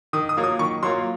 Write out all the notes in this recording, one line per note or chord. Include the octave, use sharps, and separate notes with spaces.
D#3 D#6
D#6
F#3 A#3 F4
D#6
D#3 C#6
F#3 A#3 F4 C6